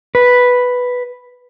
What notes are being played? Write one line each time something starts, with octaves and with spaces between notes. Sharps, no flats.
B4